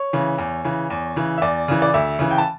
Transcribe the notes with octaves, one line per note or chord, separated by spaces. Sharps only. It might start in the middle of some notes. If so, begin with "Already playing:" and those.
Already playing: C#5
C#3 E3
E2
C#3 E3
E2
C#3 E3
E5
E2 D5
C#3 E3
D5
D2 E5
C#3 E3
G5
A5